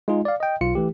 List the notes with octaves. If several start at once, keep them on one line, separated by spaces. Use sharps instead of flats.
G#3 D#4 F4 G#4
D5 F5
D#5 G5
B1 F4 C#7
E3 A3 G4